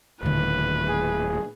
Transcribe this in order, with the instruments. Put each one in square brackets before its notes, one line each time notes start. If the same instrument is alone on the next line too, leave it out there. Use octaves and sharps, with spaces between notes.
[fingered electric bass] D#1 A2 [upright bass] D3 D#3 [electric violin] B4
[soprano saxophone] G#4